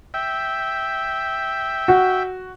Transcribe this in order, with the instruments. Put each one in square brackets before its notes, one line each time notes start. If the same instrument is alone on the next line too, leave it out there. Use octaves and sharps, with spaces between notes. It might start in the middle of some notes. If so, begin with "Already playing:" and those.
[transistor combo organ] E5 G5
[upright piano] F#4